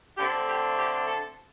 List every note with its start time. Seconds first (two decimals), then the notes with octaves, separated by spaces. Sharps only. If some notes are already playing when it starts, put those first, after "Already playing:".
0.17 D3 A3 C4 G4
0.48 G4
0.77 G4
1.07 A4